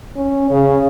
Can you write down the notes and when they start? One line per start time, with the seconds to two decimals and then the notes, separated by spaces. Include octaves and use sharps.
0.16 C#4
0.51 C#3